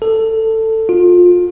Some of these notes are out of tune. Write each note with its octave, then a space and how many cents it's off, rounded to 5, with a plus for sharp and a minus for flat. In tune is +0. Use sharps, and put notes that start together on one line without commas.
A4 +15
F4 +25